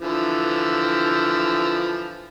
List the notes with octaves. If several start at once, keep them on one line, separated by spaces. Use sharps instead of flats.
D3 E3 F3